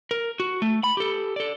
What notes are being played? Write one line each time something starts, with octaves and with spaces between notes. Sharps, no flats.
A#4
F#4
A3
B5
G4 A4
A4 D5